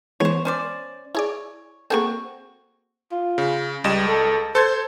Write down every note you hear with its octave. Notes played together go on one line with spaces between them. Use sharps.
E3 G#3 B3 C5 C#5
C#4 C5 D5
E4 G#4 C#5 D5
A#3 C4 F#4 G#4 A4 C#6
F4
C#3
C#2 G3 D#5 E7
A4
A4 C5 C6 G#6